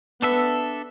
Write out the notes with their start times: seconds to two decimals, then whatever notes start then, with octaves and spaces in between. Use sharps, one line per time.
0.22 B3 D4 A4 E5